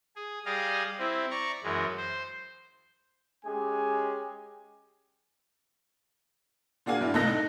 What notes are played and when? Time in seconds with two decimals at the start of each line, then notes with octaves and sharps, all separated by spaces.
0.16 G#4
0.46 G3 G#4 D5 D#5 F5
0.99 C4 E4
1.31 D5 A#5 C#6
1.63 F#2 E3 G#3
1.98 C5
3.45 G#3 C#4 G4 G#5
6.86 A#2 D4 F#4 G#4 F5 G#5
7.01 G2 D4 E4
7.14 C2 A2 A4 D#5 F#6 A#6
7.27 D#4